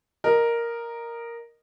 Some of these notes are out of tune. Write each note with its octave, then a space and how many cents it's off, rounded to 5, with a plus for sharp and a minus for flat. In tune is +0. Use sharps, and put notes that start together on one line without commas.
A#4 +0 D#5 -15